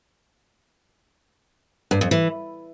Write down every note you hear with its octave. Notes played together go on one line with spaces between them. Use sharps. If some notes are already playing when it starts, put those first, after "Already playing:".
G2
F2
E3